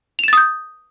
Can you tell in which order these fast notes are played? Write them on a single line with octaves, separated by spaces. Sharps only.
F7 E7 A6 D#6 G6